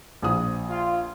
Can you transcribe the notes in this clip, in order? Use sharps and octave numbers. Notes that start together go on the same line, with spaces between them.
A#1 F3 D#6
F4